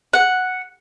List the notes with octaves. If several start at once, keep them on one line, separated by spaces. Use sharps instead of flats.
F#5